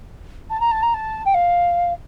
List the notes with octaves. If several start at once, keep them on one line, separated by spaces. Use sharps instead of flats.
A5
A#5
A5
A#5
A5
G5
F5